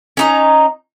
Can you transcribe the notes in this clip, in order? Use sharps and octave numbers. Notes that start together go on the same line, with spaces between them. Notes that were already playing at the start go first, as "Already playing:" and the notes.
C#4 D#4 A#5